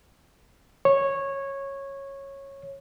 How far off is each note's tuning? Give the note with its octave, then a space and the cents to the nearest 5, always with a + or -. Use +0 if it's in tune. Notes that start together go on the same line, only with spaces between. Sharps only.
C#5 -10